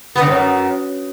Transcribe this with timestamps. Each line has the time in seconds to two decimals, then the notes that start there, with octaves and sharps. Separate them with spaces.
0.15 B3
0.21 D3
0.26 G#2
0.31 F#2